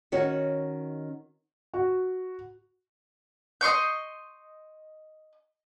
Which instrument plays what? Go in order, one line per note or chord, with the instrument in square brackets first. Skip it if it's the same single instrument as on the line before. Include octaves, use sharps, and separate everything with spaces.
[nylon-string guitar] D#3 C#4 F#4 C#5
[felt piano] F#4
[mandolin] D#5 C6 C#6 G6